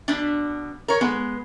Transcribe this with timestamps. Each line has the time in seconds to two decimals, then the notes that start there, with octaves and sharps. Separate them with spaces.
0.08 B2 D4
0.88 A#4 C#5
1.01 G#3 B3